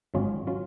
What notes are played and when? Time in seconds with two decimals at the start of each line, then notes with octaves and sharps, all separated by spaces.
0.14 G#1 G#2 F#3 C#4 F4
0.47 F#3 C#4 F4